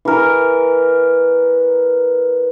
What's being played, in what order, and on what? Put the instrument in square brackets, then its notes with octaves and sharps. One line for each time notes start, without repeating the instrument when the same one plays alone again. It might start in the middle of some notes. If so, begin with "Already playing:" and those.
[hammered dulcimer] E3 A#4